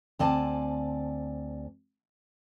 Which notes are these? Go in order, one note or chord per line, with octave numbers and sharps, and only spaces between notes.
D2 C4 D5 G#5 A5